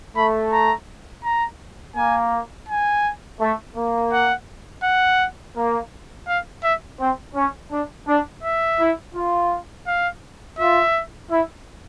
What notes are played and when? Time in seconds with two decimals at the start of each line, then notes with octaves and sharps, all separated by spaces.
0.16 A3 B5
0.52 A#5
1.24 A#5
1.96 A#3 G#5
2.69 G#5
3.41 A3
3.76 A#3
4.13 F#5
4.84 F#5
5.56 A#3
6.28 F5
6.63 E5
6.99 C4
7.35 C#4
7.71 D4
8.07 D4
8.43 E5
8.79 E4
9.14 F4
9.87 F5
10.59 F4 E5
11.30 E4